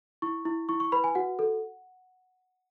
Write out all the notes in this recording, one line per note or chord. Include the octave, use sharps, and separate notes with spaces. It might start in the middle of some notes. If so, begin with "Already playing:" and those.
E4 C#6
E4
E4 C#6
C#6
B4 B5
G#5
F#4 F#5
A4